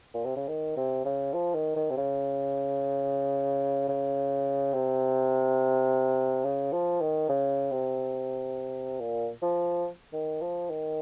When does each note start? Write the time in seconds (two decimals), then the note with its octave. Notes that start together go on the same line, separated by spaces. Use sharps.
0.14 A#2
0.25 C3
0.36 C#3
0.48 D#3
0.77 C3
1.05 C#3
1.33 F3
1.54 D#3
1.76 D#3
1.90 C3
1.97 C#3
3.89 C#3
4.74 C3
6.45 C#3
6.73 F3
7.01 D#3
7.29 C#3
7.72 C3
9.00 A#2
9.42 F3
10.13 D#3
10.41 F3
10.70 D#3